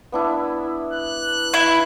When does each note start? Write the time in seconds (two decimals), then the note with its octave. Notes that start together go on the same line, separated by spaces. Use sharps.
0.12 B3 D4 E4
0.93 F#6
1.54 E4